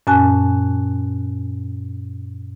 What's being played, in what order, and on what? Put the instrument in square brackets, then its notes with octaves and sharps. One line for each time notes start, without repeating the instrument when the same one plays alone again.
[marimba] F#2 A#2 C#4 G#5 A5 F#6